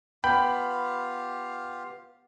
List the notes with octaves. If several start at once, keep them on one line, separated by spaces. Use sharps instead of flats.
B3 F4 G4 F5 G5 B5